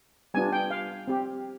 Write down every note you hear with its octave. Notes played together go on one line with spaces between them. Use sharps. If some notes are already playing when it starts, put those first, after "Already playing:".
G3 B3 D4 F4 G#5
G5
F5
C4 G4